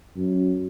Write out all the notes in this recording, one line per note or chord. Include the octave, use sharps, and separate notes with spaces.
F#2